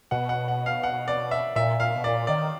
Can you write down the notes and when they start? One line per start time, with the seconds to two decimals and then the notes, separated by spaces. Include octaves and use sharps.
0.11 B2 F#5
0.29 F#5
0.48 F#5
0.66 F5
0.83 F#5
1.08 D5
1.31 E5
1.56 A#2 E5
1.80 A#2 F5
1.96 B2
2.04 A#2 D5
2.27 D#3 D5